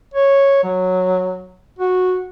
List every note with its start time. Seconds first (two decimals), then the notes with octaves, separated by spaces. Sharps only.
0.14 C#5
0.63 F#3
1.79 F#4